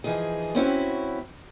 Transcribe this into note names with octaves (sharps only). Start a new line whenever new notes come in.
E3 F3 D#4 G#4
C4 C#4 E4 F#4